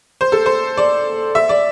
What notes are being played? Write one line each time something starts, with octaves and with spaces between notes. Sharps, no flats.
C5
A4
C5
D5
E5
D5